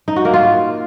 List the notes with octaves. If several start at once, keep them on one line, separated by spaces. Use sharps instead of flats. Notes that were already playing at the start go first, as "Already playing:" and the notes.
D#4
F#4
A#3
F4